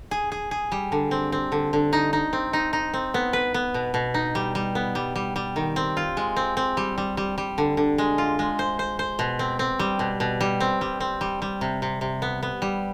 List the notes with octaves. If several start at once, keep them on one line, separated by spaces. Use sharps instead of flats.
G#4
G#4
G#4
G3
D3
C4
C4
D3
D3
D#4
D#4
C4
D#4
D#4
C4
B3
B4
B3
B2
B2
D#4
G3
G3
B3
G3
G3
G3
D#3
C4
F4
G#3
C4
C4
G3
G3
G3
G3
D3
D3
G#3
F4
G#3
C5
C5
C5
B2
C4
C4
G3
B2
B2
G3
C4
G3
C4
G3
G3
C3
C3
C3
B3
B3
G3